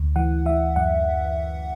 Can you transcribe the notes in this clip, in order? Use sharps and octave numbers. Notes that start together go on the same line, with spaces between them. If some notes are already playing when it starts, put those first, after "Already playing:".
Already playing: D2
E3 F#5
E3 E5
F#2 F#5